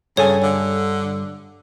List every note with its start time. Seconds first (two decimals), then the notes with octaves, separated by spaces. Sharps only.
0.17 G2 C#3 A4 C#5 G#5
0.43 D3